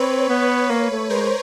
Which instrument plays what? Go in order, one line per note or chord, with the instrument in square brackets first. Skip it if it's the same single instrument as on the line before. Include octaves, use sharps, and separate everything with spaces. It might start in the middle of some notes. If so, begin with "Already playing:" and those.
Already playing: [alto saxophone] C4 [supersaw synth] B4 C#5
[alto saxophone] B3
[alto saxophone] A#3 [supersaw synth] B4 C#5
[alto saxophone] A3
[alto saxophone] G#3 [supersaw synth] A#4 C5